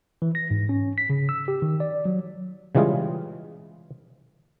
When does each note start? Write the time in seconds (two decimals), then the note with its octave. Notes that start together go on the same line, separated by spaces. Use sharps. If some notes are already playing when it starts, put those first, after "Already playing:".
0.22 E3
0.35 A#6
0.51 G#2
0.69 C#4
0.98 B6
1.10 C#3
1.29 E6
1.48 G4
1.62 D#3
1.80 D5
2.05 F#3
2.75 C#3 E3 G3 G#3 F4 G#4